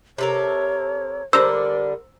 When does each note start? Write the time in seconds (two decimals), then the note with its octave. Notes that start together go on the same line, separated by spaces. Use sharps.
0.18 C3 A4 A#4 C#5
1.33 D3 G3 D4 A#4 C5 A#5 E6